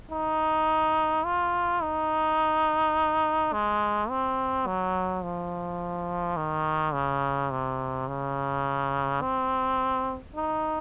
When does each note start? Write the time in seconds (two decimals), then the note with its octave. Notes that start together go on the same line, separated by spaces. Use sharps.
0.11 D#4
1.25 F4
1.82 D#4
3.53 G#3
4.10 C4
4.67 F#3
5.23 F3
6.37 D#3
6.94 C#3
7.51 C3
8.08 C#3
9.22 C4
10.35 D#4